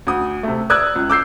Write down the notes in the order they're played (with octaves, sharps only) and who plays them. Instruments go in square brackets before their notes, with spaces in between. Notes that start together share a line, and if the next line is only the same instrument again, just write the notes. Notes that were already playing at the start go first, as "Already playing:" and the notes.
[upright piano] D2 D#6
C3 A3
D5 D#6 E6 F#6 G#6
C#2
D6 E6 G6 C7